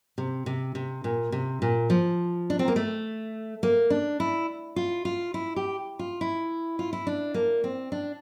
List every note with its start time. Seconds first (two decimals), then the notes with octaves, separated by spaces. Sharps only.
0.18 C3
0.46 C3
0.75 C3
1.04 A#2
1.32 C3
1.62 A#2
1.90 F3
2.50 D4
2.59 C4
2.68 A#3
2.76 A3
3.63 A#3
3.90 D4
4.20 E4
4.76 F4
5.05 F4
5.34 E4
5.56 G4
5.99 F4
6.21 E4
6.79 F4
6.93 E4
7.07 D4
7.34 A#3
7.64 C4
7.92 D4